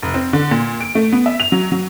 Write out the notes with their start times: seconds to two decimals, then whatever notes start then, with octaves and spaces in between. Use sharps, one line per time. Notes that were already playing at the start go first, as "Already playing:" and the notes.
0.02 F1
0.14 C4
0.33 D3
0.51 A#2
0.80 D7
0.95 A3
1.12 B3
1.26 E5
1.40 F7
1.52 F#3
1.72 F#3